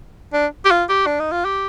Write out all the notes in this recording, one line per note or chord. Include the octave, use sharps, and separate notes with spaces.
D4
G4
F4
G4
D4
D#4
F4
G4